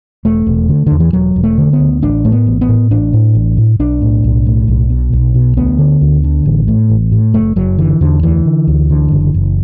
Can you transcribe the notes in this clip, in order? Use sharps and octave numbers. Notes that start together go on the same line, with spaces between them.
E1 A3
E1
D3
E2 D3
E3
E1 F#3
E1
A3
D3
B3
D2
A1 D4
A2 A3
B3
A1
B3
A2
A1 D4
A2
A1
A2
B1 D4
A2
B1
A2
B1
B2
B1
B2
D2 B3
D3
D2
D3
A1
A2
A1
A2
F#1 A3
F#1 F#3
D3 E3
E2 D3
D2 E3
D3
D2
D3
F#1
F#1